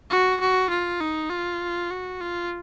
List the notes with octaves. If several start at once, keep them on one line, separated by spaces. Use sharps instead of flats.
F#4
F#4
F4
D#4
F4
F#4
F4